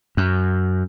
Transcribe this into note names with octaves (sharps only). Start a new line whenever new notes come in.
F#2